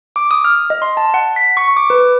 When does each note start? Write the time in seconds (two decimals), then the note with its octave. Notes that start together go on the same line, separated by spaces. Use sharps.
0.16 D6
0.31 D#6
0.45 F6
0.70 D#5
0.82 C6
0.97 A5
1.14 F#5
1.36 B6
1.57 C#6
1.77 D6
1.90 B4